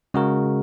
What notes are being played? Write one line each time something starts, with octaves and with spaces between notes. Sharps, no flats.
C#3 G#3 F#4 A#4